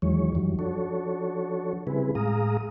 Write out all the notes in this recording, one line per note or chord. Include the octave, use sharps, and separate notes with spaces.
E2 D#3 E3 F#3 G#3 C#5
F#2 D#3 E3 F#3 G3
F3 D4 F#4 A4 C#5
C#3 G3 C4 E4 G#4 B4
A2 G#3 G#4 F5 A#5 D#6